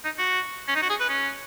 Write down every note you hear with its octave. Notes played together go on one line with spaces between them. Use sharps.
D#4
F#4
C#4
D#4
F#4
G#4
B4
C#4